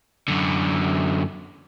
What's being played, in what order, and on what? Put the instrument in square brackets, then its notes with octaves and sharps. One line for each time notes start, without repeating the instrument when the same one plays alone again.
[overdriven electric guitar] F#2 D3